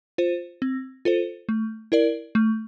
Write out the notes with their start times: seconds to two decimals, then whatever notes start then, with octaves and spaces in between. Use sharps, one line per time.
0.18 F4 C5
0.62 C4
1.05 F4 A4 C5
1.49 A3
1.92 E4 A#4 D5
2.35 A3